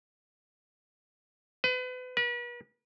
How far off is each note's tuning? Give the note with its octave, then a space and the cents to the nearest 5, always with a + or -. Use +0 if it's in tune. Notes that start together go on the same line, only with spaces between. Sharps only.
B4 +35
B4 -40